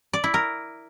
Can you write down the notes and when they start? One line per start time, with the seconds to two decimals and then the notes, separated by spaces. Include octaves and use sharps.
0.13 D5
0.24 E4
0.34 A#4